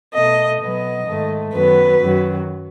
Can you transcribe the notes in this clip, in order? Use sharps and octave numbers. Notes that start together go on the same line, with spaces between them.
B2 A3 D#5
B2 F#3 B3 D#5
G#2 D#3 A3
F#2 D#3 F#3 B3 B4
F#2 D#3 F#3